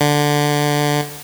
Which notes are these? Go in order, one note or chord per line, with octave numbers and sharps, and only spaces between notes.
D3